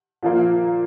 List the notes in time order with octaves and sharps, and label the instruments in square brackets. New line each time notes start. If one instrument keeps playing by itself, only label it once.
[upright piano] A#2 F3 A#3